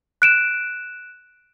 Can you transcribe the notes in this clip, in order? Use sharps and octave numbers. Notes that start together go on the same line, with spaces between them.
F#6 D7 E7